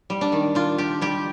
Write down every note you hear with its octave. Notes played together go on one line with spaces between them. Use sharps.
G3
D4
D#3
D4 F4
D4 G4
G3 G4